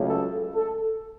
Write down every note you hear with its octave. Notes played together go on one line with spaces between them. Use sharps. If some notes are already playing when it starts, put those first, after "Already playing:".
Already playing: C#2 C#3 F#3 A3
A4
A4